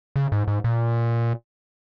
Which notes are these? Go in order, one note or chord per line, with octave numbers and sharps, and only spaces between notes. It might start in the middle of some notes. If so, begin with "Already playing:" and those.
C#3
G#2
G#2
A#2